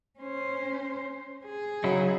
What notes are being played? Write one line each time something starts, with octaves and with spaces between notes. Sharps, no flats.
C#4 C5
G#4
C#3 F#3 D#4 E4